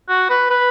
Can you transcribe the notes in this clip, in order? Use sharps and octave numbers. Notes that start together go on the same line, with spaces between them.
F#4
B4
B4